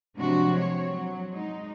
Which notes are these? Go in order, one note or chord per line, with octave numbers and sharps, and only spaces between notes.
C3 F3 F#3 G#3 D4 F#4
C4 C#5
F#3
G#3 D#4